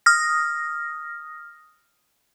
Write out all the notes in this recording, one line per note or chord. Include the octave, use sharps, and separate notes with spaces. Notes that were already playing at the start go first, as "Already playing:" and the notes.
D#6 F6 A#6